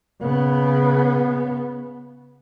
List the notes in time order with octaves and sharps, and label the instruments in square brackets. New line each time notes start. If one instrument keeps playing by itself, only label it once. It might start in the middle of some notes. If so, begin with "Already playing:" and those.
[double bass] C#3 B3